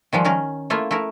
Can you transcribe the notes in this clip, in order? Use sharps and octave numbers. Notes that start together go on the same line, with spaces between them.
D#3 F3 G3 G#3
D#3 C#4 A#4
A3 A#3 E4 F4
A3 E4 A#4